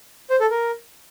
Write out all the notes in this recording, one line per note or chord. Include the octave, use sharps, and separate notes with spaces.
C5
A4
A#4